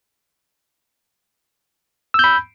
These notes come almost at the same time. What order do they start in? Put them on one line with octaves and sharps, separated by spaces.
E6 G6 B5